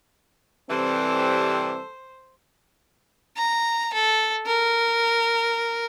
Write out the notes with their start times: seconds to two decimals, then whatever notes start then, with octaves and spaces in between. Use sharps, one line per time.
0.70 C3 E3 G3 C4 A4 C5
3.37 A#5
3.93 A4
4.46 A#4